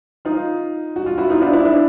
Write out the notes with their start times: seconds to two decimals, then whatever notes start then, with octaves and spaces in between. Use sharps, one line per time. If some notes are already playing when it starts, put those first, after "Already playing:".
0.25 D#4 F4
0.96 F#4
1.06 F4
1.18 E4 F#4
1.30 D#4 F4
1.41 D4 E4
1.53 D4 E4
1.65 D4 E4